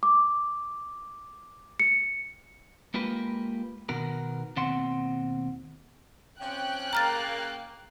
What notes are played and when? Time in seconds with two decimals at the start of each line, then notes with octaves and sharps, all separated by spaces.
0.03 D6
1.80 C#7
2.94 G#3 A#3 F4 G4 B4
3.89 B2 D#3 B3 F#4 A#4
4.56 D#2 B2 C4 F#5 C6
6.40 C3 F3 C#4 G5 F#6
6.93 C#3 A#3 A#5 F6 A6